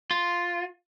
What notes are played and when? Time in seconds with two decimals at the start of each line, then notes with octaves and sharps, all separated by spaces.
0.11 F4